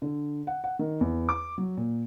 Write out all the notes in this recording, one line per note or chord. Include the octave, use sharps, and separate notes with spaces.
D3
F#5
F#5
D#3
E2
D6
F#3
A#2